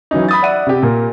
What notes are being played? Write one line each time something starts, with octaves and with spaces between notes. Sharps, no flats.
E3 F#3 C#4 D#4
B5 D#6 A6
D5 E5 F#5 D#7
C3 G4
A#2 A#4